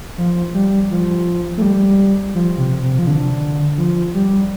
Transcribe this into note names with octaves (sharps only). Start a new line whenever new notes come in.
F3
G3
F3
A3
G3
F3
C3
C3
F3
D3
F3
G3